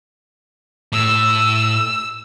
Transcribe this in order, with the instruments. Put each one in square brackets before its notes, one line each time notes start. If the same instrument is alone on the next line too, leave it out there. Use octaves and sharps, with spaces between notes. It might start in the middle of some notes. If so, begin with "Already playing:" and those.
[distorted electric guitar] A2 [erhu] E6